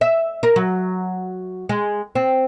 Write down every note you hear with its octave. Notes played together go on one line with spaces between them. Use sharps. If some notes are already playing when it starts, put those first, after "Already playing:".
E5
A#4
F#3
G#3
C4